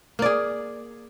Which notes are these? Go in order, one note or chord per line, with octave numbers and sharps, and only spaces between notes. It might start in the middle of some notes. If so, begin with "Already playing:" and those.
A#3 G#4 D5